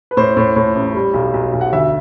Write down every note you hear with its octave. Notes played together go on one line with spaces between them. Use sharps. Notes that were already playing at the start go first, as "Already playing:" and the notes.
B4
A2 C5
A2
A2
A1
G3
B1
B1
B1
F#5
D2 E5